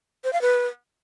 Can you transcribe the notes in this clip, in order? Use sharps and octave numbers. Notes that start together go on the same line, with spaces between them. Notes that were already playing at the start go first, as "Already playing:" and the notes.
C5
F5
B4